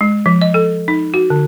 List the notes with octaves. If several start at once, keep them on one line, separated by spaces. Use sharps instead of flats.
G#3
F3
D#5
A4
D#4
F#4
D3